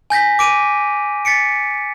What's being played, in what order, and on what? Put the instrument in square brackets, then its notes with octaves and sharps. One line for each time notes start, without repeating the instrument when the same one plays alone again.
[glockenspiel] G#5 G6 A#6 B6
D6 D7 D#7
A6 B6 C#7 D7